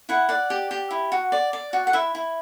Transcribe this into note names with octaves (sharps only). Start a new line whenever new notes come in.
E4 F#5
D5 F#5
G4
G4
E4
F#4
D5
D5
F#4
F#5
E4 E5
E4